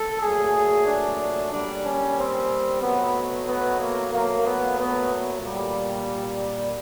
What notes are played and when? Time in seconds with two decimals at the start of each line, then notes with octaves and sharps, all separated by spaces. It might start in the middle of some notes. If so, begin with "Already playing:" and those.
Already playing: A4
0.21 A#2 F#3 A3 G#4
0.86 D4
1.51 A#2 G3 D4
1.84 C#4
2.17 C4
2.81 B2 F#3 A3 B3
3.47 B3
3.79 A#3
4.11 A#2 F#3 A3 A#3
4.44 B3
4.77 B3
5.42 A#2 G3